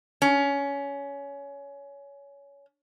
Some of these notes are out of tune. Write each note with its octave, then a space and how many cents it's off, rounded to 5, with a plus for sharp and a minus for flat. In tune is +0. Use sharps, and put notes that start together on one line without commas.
C#4 +20